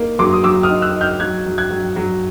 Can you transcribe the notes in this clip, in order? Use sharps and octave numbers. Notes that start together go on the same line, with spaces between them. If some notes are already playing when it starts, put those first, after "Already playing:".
Already playing: A#3 D#4
F#3 C6 D6
D#6
F#3 D6 E6
D#6 F6
D#4
E6 F#6
D#4
F6 G6
F#3 F#6 G#6
F#3
F#6 G#6
F#3
F#3